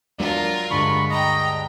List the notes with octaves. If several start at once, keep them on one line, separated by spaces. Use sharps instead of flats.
F#3 D4 F4 A#4
D2 G2 G#3 B5 C#6
D#5 G5 A#5